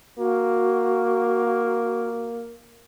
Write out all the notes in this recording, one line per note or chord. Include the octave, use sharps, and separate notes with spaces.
A#3 F#4